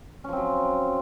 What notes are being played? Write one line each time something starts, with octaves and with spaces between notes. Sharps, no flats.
F3 F#3 C4 C#4